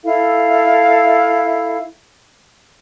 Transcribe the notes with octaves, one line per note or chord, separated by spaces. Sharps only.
E4 A4 F5